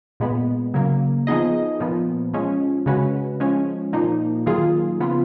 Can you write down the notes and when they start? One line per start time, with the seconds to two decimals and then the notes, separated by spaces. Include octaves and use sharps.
0.20 A#2 G#3 B3
0.74 C#3 F#3 A#3
1.27 F3 B3 D#4 G#4 D#5
1.80 A#2 F3 B3
2.34 F3 G#3 C#4
2.86 C#3 G#3 C#4 F#4 B4
3.40 F3 G#3 C#4
3.93 A#2 F3 A#3 D#4
4.46 D#3 F#3 A#3 F4 G#4
5.00 C#3 F3 B3 F4